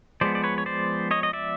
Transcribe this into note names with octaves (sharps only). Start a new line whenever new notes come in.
F3 G#3 B3 C5 D5
D5
B4 C#5
C#5
C5 D5
C#5 D#5
D#5
D5 E5